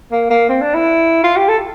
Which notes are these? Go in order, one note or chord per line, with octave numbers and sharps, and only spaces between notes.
A#3
A#3
C4
D4
E4
F4
G4
A4